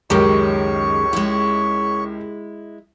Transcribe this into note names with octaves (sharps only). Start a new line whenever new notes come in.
C#2 F#2 D#3 G#3 G4 A#4 C#5 C#6
G#3 E4